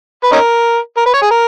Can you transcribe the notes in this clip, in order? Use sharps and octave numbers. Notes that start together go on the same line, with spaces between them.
B4
C#4 D#4 A#4
A#4
B4
C#5
G#4
A#4